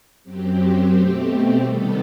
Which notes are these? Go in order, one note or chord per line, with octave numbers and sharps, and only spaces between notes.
F#2 F#3 C4 G4
B2 A3 C4
C3 D#3 G3 B3 A4